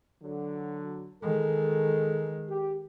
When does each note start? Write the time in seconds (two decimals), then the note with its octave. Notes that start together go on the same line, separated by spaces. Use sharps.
0.23 D3 F#3
1.23 D#3 G#3 A4
2.49 G4